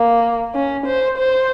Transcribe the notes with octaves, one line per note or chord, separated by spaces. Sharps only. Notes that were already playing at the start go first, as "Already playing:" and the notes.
Already playing: A#3
C#4
C5
C5